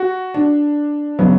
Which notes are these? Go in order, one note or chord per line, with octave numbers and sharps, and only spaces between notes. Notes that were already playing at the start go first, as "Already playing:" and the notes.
Already playing: F#4
D4
C#3 F#3 B3